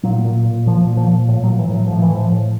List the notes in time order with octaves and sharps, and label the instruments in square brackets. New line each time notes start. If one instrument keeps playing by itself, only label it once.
[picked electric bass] A#2 F#3
A#2
A#2
A#2 F3
A#2
F3
A#2
A2
F#3
A2
E3
A2 F#3
A2 F3
E3
A2 F3
A2